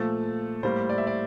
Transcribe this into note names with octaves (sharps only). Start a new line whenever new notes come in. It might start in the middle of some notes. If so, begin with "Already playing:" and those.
Already playing: A#2 F3 A3 A4
A2 G3 A#3 C5
D5
E5
D5